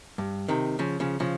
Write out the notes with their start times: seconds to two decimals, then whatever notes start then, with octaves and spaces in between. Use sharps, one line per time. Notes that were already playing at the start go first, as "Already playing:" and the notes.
0.18 G2
0.48 C3 D#3
0.79 C#3 F3
1.00 C#3 F3
1.20 C#3 F3